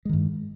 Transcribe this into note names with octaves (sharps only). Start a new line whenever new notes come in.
G2 D#3 G#3